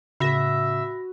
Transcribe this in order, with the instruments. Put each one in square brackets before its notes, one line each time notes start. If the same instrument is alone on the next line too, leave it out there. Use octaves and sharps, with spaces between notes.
[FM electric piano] A2 C#3 [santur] F#4 B4 [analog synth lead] E5 [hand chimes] B5 A#6